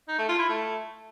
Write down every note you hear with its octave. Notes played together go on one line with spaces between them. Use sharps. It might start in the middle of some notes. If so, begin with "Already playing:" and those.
D#4
A3
F4
E4
A3